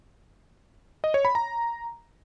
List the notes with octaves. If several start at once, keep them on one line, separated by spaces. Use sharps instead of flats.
D#5
C#5
B5
A#5